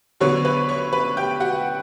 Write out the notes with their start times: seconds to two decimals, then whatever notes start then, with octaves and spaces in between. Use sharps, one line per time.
0.20 D3 F#3 B3 C#5 C#6
0.45 B4 B5
0.69 C#5 C#6
0.93 B4 B5
1.17 G4 G5
1.40 F#4 F#5